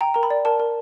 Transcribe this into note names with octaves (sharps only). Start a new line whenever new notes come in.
G5 A#5
A#4 A#5
B5
D5
A#4 A5
A#4